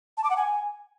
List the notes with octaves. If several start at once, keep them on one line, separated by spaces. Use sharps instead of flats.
A5
D6
F#5
G#5